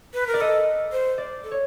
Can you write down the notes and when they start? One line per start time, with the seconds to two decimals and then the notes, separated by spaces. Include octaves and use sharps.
0.14 B4
0.27 A#4
0.34 D5
0.41 A4 D#5
0.92 C5
1.18 D5
1.44 A4
1.51 C#5